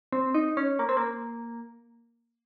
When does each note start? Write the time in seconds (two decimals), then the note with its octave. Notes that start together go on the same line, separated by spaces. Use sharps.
0.13 C4
0.34 D#4
0.57 C#4
0.79 A#3
0.89 C4
0.97 A#3